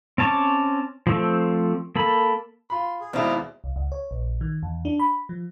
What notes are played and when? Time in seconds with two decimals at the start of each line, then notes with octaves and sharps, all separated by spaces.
0.18 C4 C#4 A5 C#6 D6
1.07 F3 A3 C4
1.96 A#3 A4 B5
2.70 F4 B5 C6
3.00 G#4
3.13 D#2 B2 G#3 C4 E4 D5 D#5 F5
3.64 C2
3.76 C#2
3.92 C#5
4.11 A#1
4.41 D#3
4.63 E2
4.85 D4
5.00 B5
5.29 F3